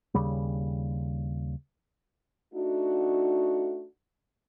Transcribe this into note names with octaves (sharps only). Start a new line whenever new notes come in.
D#2 C#3 G3
A3 D4 D#4 F#4